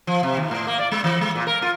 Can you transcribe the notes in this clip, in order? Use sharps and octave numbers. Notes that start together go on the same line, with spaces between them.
F3
C3
D#2
A2
A#3
D5
G#3
E3
G#3
A#2
A#4
F4